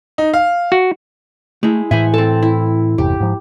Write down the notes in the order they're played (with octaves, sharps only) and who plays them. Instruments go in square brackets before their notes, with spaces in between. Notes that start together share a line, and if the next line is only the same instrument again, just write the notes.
[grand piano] D#4
F5
[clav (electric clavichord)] F#4
[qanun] G#3 E4 [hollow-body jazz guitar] A3
[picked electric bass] A2 E3 [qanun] C5 F#5 G#5 [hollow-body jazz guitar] E5
[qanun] C4 A5 [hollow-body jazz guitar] A4
[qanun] E4
[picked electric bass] G1 E2 C3 [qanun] G4
[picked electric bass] G#2 F3